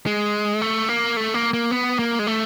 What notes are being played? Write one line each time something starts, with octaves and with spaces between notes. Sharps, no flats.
G#3
A3
A#3
A3
A#3
A#3
B3
A#3
G#3
A3